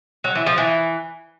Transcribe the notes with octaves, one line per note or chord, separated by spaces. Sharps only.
F#3
E3
F3
E3